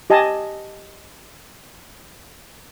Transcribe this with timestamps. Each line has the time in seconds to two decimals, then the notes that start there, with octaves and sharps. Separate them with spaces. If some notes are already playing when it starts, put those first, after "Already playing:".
0.10 G4 D#5 G#5 A5